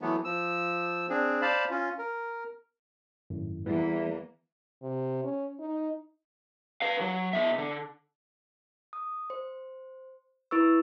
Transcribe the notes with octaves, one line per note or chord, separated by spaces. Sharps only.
E3 F#3 A3 B3
F3 E6
C4 D4 G#4
C5 D5 F5 A5 B5
C#4 F4
A#4
G#1 F#2 A2
E2 E3 G3 A#3 E4 B4
C3
C#4
D#4
B4 F5
F#3
B2 E5
D3
D#6
C5
E4 B4 C#6 E6